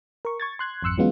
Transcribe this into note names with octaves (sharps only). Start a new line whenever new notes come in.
A#4 C#6
C#6 G#6 A6
C6 F#6 G#6
G#1 F2 C6 E6 F#6 C#7
E3 F#3 G#3 B3 C#4 F4